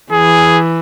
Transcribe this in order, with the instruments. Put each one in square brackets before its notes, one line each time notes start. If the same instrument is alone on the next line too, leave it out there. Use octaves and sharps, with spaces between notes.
[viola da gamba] E3 [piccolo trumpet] G#4